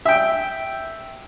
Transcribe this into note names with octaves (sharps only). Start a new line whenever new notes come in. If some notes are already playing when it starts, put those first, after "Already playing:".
E5 G5